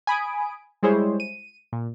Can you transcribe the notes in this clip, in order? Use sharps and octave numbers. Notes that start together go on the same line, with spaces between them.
G#5 B5 D#6 D7
G3 G#3 E4 G#4 C5 C#5
D#7
A#2